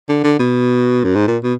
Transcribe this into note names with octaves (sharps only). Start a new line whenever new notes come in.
D3
D3
B2
F#2
G#2
A#2
B2